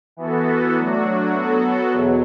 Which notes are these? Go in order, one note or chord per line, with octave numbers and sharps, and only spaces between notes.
E3 B3 F#4 A4
F#3 A3 D4 F#4
F#3 B3 F#4 A4
E2 B2 F#3